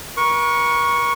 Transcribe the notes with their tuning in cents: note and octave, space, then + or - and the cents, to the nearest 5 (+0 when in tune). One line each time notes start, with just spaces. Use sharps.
A#4 +45 C#6 +0